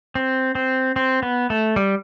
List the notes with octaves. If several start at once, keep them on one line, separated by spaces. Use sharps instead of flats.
C4
C4
C4
B3
A3
G3